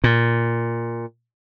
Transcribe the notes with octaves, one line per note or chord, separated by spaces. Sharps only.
A#2